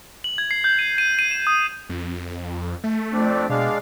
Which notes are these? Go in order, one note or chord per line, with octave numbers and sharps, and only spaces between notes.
F#7
G#6
C7
G6
D#7
D#7
D#7
E7
D#6
F2
A3
F2 C4 D4
B2 G#3 D4 F5